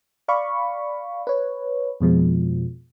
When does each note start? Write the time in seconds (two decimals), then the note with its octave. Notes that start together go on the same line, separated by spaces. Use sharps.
0.28 D5 F5 B5 C#6
1.27 B4 C#5
2.01 F2 B2 F3 G#3